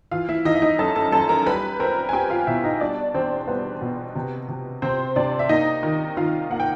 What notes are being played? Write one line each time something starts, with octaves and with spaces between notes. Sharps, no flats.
E3 F4 F5
E4 E5
E3 D#4 D#5
E5
D#4 D#5
F#2 A4 A5
A4 A5
F#2 A4 A5
A#4 A#5
G3 B4 B5
C4 A#4 A#5
G#5
C4 G4 G5
F4 F5
B2 E4 E5
D#4 D#5
G3 D4 D5
E2 C4 C5
G3 B3 B4
B2
C3
C3
C3 C4 C5
C3 D4 D5
E5
A#3 D#4 D#5
D#3
D#3 F4 F5
A#3 F#5
G5